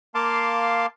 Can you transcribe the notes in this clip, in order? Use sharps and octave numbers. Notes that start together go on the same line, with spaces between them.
A#3 F5 A5 C6 D6